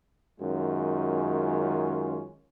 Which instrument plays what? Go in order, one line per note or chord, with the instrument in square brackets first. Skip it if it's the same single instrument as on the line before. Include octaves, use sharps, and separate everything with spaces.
[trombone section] F#2 D#3 G#3 C#4 F4